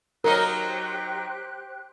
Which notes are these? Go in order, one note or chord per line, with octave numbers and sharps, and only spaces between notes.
F#3 D#4 G4 A#4 C5 D#5 F#6